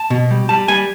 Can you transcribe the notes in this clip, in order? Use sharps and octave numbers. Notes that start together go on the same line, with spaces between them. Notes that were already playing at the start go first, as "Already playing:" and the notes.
Already playing: A5
B2
G3
G3 A5
G3 G#5